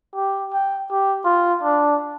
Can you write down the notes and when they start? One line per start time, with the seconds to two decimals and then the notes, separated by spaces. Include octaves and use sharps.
0.15 G4
0.53 G5
0.90 G4
1.25 F4
1.63 D4